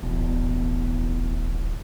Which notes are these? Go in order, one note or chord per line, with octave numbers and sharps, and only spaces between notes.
D1 A1 E2 B2